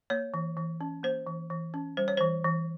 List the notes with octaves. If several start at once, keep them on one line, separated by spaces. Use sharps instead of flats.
A#3 C#5
E3
E3
C#4
A#3 C5
E3
E3
C#4
G3 C5
C#5
E3 C5
E3